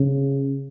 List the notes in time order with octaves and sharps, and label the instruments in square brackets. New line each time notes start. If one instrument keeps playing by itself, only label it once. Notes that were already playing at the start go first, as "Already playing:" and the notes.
Already playing: [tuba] C#3